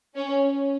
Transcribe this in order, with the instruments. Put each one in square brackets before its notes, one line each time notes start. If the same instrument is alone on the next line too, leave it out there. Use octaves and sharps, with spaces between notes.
[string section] C#4